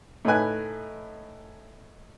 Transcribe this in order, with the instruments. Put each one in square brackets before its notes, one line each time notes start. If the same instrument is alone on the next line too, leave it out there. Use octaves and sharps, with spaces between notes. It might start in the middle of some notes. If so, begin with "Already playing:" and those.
[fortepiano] A2 A3 D#4 B4 G#5 F#6